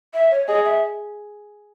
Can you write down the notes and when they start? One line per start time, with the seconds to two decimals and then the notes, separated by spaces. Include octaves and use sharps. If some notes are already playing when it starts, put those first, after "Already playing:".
0.14 E5
0.31 C#5
0.48 G#4 D#5
0.65 E5